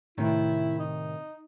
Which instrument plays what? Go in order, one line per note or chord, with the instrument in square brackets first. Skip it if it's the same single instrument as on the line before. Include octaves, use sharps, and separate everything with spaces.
[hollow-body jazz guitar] A2 C3 D#3 [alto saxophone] E4
[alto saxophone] D#4